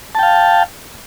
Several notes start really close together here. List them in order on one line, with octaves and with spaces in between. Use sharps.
A5 G5 F5